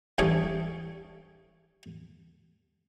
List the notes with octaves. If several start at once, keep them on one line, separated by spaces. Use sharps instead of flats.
G2 E3 C#4 G#4 A4 D6